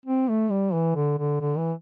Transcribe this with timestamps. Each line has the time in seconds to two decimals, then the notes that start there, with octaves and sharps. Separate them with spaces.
0.06 C4
0.29 A3
0.50 G3
0.73 E3
0.96 D3
1.18 D3
1.41 D3
1.58 E3